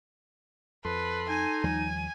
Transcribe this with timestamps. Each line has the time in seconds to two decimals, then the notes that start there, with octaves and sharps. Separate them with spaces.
0.85 F2 A4 B4 C6
1.29 D#4 G#5
1.63 D#2 F3 G3 G#5